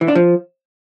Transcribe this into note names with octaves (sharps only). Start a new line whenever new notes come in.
E3
D4
F3